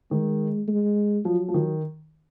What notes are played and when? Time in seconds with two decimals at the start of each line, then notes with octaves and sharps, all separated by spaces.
0.11 D#3 G#3
0.68 G#3
1.25 F3 F#3
1.49 F3
1.54 D#3